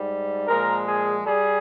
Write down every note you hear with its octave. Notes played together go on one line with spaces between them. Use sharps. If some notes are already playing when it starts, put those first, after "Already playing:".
Already playing: G#2 G3
A#2 F3 G#3 A#4
G#4
G3 G#4